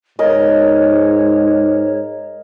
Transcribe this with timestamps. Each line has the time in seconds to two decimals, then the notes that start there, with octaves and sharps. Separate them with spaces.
0.19 G#2 A#4 C#5 D#5